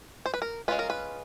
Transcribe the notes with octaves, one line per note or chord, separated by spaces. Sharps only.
C5
B4
A#4
G#3 C#4 F4 B4
A#4
B4